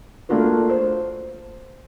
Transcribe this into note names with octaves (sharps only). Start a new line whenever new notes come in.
A3 A#3 D4 F4 F#4 B4
C5